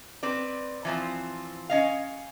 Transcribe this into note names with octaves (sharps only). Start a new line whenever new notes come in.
C4 B4 D5
E3 F3 C4
C#4 D#5 F5